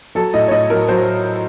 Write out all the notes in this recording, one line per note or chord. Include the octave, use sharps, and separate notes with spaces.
F#3 A4
A2 D#5
C#5
A2 D#5
F#3 A#4
F#3 C5